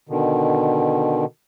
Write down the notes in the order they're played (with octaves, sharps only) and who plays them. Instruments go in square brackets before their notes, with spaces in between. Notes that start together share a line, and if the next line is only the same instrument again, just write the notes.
[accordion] B2 D3 D#3